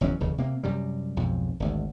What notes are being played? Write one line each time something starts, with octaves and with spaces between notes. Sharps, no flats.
F#1 E2 F#3 C#4
F1 D#2 C#3
C3 A#3
F#2 C3 G3
B1 F2 G#2
G#1 D2